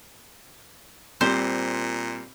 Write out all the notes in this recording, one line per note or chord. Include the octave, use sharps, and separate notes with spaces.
A#2 G3 C4 C5